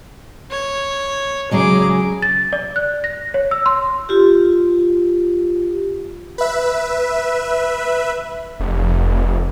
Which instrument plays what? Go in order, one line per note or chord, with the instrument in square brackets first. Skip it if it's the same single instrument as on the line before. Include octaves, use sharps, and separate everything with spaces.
[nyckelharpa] C#5
[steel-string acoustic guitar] C#3 F#3 G#3 [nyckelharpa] G#4 D6
[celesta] A6
D5
F#6
A#6
C#5
E6
C6
[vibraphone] F4 G4
[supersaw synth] B4 E5
[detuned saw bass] F1